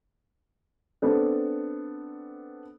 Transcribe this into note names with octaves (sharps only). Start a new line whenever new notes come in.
B3 C4 D4 A4